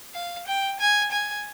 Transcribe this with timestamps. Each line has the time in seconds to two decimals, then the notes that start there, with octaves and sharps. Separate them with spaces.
0.14 F5
0.47 G5
0.80 G#5
1.11 G#5